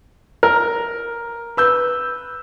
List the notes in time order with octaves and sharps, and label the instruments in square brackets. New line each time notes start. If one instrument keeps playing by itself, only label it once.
[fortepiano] A#4
[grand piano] B4 E6 G6